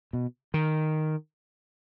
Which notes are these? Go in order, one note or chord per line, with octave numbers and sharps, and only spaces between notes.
B2
D#3